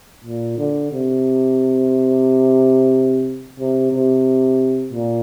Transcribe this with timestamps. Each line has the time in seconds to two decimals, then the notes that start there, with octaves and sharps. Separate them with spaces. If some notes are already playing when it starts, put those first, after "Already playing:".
0.24 A#2
0.58 D3
0.92 C3
3.59 C3
3.92 C3
4.93 A#2